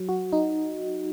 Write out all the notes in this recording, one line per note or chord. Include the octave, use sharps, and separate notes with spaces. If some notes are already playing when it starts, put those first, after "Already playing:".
Already playing: F#3
F#4
D#4